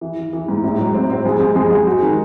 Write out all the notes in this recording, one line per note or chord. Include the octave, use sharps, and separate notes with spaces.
E3
E3
E3
G#2
A2
F#3
C4
C4
G#3
G#3
G#3
G#3
F#4
D#3